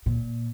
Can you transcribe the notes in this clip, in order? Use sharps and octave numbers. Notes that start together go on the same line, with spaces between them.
A#2